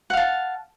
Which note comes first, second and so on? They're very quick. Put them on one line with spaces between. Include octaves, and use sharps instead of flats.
F#5 F5 A5